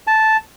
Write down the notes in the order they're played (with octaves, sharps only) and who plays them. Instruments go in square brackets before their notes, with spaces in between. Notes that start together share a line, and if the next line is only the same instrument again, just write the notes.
[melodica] A5